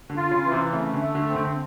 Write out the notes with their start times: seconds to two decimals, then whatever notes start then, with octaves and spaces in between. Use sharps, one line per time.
0.10 D3
0.17 F4
0.31 C#3
0.45 E3
0.52 C3
0.73 C#3 A3
0.94 D3
1.00 A3
1.15 D3
1.28 C4
1.36 D3